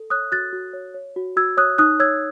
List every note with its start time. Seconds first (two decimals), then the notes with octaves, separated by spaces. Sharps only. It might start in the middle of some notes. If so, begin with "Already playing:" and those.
Already playing: A4
0.10 C#5 D#6 F#6
0.32 F#4 F#6 A6
0.53 F#4
0.73 C#5
0.94 C#5
1.16 F#4
1.36 F#4 E6 G#6
1.57 C#5 D#6 F#6
1.78 D#4 D#6 F#6
2.00 C#5 E6 G#6